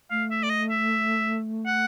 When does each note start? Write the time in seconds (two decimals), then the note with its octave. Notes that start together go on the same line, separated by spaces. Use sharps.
0.11 A3 F5
0.31 E5
0.43 D5
0.50 D#5
0.70 E5
1.66 F#5